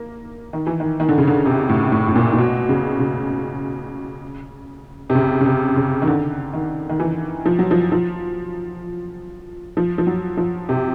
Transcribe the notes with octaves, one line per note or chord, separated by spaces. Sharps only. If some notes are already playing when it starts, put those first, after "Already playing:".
Already playing: A#3
D#3
E3
D#3
D#3
D3
C#3
D3
C3
A2
A2
A2
A#2
A#2
B2
C#3
C#3
C3
C#3
C#3
C3
C#3
D#3
D3
D#3
D#3
E3
F3
F#3
F3
F3
F3
F3
F#3
F3
C3